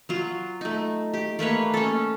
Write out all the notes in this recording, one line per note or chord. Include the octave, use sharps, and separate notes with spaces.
F#3 F4
A3 D#4
G4
A3 A#3 B4 C#5
C#4 A4